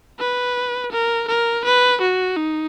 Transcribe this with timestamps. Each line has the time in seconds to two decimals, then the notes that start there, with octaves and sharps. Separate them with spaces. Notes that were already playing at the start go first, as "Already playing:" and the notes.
0.19 B4
0.92 A#4
1.28 A#4
1.65 B4
2.01 F#4
2.37 D#4